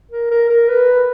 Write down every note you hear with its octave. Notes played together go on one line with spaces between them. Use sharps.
A#4
A#4
A#4
B4